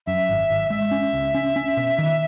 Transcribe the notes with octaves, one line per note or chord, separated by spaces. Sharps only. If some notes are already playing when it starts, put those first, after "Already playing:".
F#2 E5
G#1
G#1
G#3 E5
C#4
C#2
C#4
C#4
B2
D#3